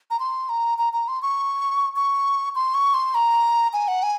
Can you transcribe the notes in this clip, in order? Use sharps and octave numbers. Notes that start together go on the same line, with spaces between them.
A#5
C6
A#5
A#5
A#5
C6
C#6
C#6
C6
C#6
C6
A#5
G#5
F#5
G#5